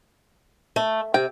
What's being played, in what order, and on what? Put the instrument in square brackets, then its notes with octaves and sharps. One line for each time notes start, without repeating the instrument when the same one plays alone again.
[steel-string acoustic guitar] A3
[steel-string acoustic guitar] C3 [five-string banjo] G5